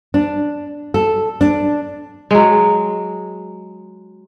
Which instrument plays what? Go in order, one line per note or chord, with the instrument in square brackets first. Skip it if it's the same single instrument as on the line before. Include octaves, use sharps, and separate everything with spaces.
[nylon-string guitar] D4
A4
D4
[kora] F#3 G#3